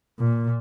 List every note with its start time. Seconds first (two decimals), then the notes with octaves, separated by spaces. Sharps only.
0.19 A#2